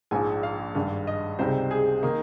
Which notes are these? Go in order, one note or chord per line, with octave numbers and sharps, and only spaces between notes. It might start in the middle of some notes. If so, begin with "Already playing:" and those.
A#1 G#2 F3 G#5
F5
G#1 G2 G3
D#5
C#2 C3 G3 C4 D#4 C5
G#4
D#3 A#3 D#4